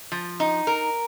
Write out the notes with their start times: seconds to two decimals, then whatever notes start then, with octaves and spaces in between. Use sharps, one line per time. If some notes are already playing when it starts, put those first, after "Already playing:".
0.12 F3
0.40 D#4
0.67 A#4